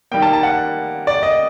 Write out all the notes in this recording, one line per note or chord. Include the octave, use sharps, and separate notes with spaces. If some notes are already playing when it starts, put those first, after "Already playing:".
D#3 G3 A#3 G5
A5
A5
F#5
D5
D#5